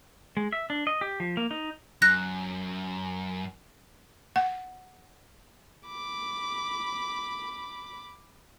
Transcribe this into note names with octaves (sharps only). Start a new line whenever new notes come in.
G#3
E5
D4
D#5
G4
F3
A#3
D#4
F#2 F#6 A#6
F#5
B5 D6